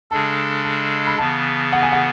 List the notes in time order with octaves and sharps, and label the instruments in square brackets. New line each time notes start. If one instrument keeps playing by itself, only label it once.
[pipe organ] C#3 G#3 D4 A4 [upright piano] A5
[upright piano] A5
B5
[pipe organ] C#3 E3 B3 [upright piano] A5
[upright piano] F#5
G#5
F#5